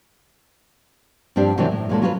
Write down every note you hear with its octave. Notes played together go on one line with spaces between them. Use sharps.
G2 F3 C4 D4 G4
C3 D#3 E3 F#3 C4 D4
A2
A#2 E3 F#3 G#3 C#4 A4
F#3 C#4 F4 A#4 B4